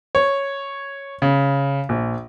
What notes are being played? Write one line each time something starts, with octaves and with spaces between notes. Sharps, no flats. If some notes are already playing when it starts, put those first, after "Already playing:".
C#5
C#3
A#1